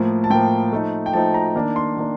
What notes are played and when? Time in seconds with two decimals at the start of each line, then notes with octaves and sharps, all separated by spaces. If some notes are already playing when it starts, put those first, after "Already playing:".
Already playing: A2 F3 A#3
0.24 A5
0.30 A2 F3 A#3 G5
0.72 F3 A3 D#4
1.06 G5
1.13 F3 A3 D#4 A5
1.34 A#5
1.55 D#3 A#3 D4
1.76 C6
1.96 D#3 A#3 D4